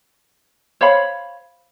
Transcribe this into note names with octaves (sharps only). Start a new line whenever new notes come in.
C5 C#5 F5 B5